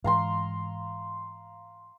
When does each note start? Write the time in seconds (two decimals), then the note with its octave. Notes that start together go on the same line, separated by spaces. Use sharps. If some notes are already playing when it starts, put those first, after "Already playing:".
0.04 G#2 E3 F5 A#5 C6